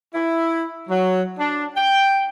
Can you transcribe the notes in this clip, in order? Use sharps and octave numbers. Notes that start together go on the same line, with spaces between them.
E4
F#3
D4
G5